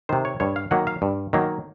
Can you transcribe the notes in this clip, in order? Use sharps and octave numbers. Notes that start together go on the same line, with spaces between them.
C3 D#3 C5
C#5
G2 C#5
F5
D#3 F#3 A#3 F#5
F5
G2
D#3 F#3 A#3